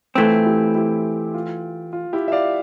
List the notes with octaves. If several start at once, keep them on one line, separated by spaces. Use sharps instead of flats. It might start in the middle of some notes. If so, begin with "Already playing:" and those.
E3 A3 C4 F4
E4 G4
E4 G4
F4
F4
E4 G4
E5
D5 F5